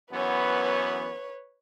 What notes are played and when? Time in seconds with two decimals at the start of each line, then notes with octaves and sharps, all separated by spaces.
0.13 F#2 E3 B3 B4 C#5